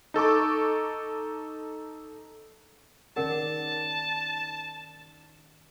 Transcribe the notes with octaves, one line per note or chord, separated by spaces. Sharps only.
D#4 A4 C#6 D6
D#3 C#4 G#4 A#4 D5 F#5 A5